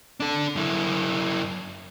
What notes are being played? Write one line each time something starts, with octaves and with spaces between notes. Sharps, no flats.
D4 A4
F#2 E4